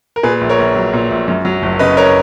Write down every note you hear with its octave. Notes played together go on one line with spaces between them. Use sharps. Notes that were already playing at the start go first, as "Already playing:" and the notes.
A#4
A#2 G#4 B4
A#1
A#4 C#5
A#1
F#3
A#2
A#1
F#2
F#3
F#1
C#3 B4 D#5
A#4 C#5